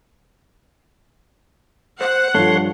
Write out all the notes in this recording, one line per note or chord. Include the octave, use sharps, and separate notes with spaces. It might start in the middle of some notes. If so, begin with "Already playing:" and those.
C5 F#5
G2 F3 A4 C#5 C6